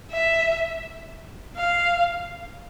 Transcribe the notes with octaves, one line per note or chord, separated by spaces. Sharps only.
E5
F5